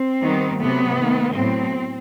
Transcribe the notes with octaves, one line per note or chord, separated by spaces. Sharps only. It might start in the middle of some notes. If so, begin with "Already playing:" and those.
Already playing: C4
D#3 G3 B3
C3 F#3 A3 B3
D#3 A3
A2 F#3 B3 C4